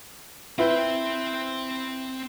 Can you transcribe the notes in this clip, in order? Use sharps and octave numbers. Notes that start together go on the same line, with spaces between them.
C4 E4 B4 G5